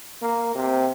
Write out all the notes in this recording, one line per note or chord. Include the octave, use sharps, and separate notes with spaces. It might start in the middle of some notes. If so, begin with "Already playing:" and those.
A#3
C3